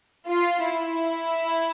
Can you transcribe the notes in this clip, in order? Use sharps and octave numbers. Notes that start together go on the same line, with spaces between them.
F4
E4